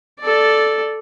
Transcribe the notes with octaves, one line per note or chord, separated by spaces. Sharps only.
A4 D5